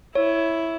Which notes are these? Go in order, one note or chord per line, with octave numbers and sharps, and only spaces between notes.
E4 C#5